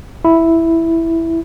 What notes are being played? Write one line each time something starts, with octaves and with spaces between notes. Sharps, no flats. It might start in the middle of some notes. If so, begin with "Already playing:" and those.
E4